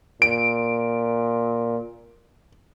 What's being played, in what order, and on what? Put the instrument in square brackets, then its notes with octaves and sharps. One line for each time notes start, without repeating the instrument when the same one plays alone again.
[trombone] A#2 [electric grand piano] D7